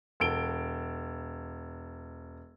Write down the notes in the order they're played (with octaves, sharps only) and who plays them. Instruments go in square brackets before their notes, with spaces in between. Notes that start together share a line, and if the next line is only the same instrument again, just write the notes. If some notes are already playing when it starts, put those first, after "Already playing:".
[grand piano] E1 A4 D7 G7